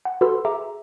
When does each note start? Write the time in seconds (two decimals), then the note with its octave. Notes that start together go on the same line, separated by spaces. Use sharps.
0.05 F#5
0.21 F#4 A4 B4 B5 C6 E6
0.45 G#4 E5 A#5 D6